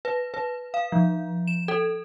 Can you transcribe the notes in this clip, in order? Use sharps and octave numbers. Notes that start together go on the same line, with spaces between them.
B4
B4
F5
F3
E7
A4